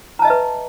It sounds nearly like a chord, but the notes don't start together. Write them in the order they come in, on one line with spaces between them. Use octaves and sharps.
A#5 A5 D#5 E5 B4